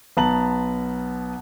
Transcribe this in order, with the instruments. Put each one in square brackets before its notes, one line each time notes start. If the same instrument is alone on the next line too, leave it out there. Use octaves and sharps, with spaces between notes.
[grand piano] B1 B3 A5 A#5 F#7